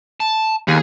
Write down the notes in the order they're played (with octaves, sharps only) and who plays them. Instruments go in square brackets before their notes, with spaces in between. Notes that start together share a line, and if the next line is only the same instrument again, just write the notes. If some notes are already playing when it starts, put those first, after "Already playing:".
[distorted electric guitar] A5
[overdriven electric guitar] D#2 [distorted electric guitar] G#4